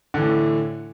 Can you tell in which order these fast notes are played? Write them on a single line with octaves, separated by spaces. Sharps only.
D3 E3 A2